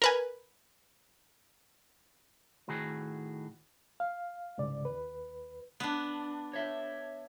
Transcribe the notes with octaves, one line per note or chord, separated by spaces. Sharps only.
A#4 B4 G#5
A2 D#3 F#4 G#4
F5
C2 G#2 C#3 D5
D#2 B4
B3 D4
C#5 E5